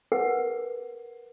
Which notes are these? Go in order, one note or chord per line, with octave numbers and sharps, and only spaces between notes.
A#4 B4 F#5